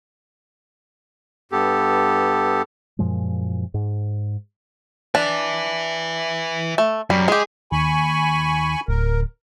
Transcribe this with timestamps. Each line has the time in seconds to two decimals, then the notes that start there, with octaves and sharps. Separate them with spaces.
1.52 G2 B3 G4 A4
2.99 F#2 A#2 F3 G#3
3.74 G#2
5.15 D4 B4 E5
6.78 A3
7.10 F#2 G3
7.28 G#3 G4 G#4
7.72 D#2 G#5 B5 C#6
8.88 D1 A#4